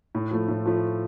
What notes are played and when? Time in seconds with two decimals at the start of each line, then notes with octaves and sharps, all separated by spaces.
0.15 A2
0.31 F3 A3
0.48 A2
0.66 F3 A3